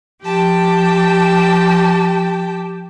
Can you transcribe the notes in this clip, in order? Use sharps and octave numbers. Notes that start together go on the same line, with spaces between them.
F3 G4 G5 A5